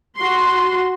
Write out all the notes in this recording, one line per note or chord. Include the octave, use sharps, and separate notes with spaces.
F#4 C6